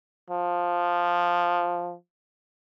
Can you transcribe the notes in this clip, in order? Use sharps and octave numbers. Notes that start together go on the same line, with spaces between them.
F3